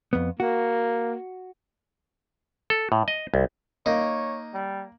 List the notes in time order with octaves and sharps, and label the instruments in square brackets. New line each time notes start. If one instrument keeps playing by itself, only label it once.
[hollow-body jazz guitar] F2 B3
[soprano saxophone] A#3 [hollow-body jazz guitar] F#4
[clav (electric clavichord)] A4
A2
D#5
C2
[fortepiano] A#3 [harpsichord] D#4 [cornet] C#5
[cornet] G3